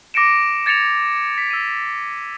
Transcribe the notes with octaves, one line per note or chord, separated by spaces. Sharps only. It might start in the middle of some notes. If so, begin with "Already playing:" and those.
D6 A#6 C#7 D7 E7
G#6 A6 C#7 E7 F7
B6
E6 D#7